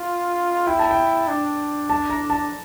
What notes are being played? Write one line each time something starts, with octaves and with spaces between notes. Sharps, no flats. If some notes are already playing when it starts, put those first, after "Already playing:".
Already playing: F4
E4 G5
A5
G5
D4
A5
A#5
A5